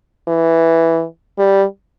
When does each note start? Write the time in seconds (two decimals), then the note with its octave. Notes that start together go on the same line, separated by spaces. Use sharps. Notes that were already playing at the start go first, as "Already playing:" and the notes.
0.28 E3
1.38 G3